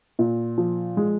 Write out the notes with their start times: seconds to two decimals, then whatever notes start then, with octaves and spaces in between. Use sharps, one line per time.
0.19 A#2
0.58 F3
0.97 G#3